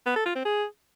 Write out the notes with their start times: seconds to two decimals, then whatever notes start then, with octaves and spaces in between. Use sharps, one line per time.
0.06 B3
0.16 A4
0.26 F4
0.35 C4
0.45 G#4